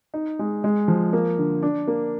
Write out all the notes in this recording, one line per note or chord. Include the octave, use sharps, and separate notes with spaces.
D#4
G#3
G#3
F3
A#3
D3
D4
A#3